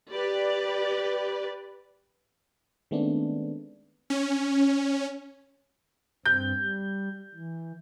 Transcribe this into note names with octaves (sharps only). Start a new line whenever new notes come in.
G4 B4 D5
D#3 G#3 A3 B3 C4 D4
C#4
G2 C4 G6
G3
E3